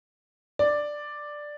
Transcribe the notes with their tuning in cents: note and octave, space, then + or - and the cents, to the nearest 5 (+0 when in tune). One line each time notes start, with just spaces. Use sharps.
D5 +5